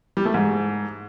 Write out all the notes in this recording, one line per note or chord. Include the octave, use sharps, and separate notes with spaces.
G3
A3
G#2